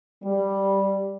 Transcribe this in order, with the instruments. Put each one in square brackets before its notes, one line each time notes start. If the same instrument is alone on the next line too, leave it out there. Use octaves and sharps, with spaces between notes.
[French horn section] G3